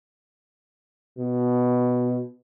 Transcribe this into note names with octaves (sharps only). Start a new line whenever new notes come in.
B2